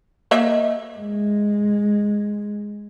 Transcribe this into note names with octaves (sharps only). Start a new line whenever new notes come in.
A#3 D#5 E5
G#3